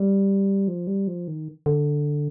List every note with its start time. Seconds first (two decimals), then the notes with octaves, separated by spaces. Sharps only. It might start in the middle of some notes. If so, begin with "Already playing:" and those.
Already playing: G3
0.68 F3
0.87 G3
1.07 F3
1.28 D#3
1.66 D3